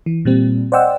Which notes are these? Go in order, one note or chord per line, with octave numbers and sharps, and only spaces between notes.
E3
A#2 G3 C4
C5 D5 D#5 F#5 G5 E6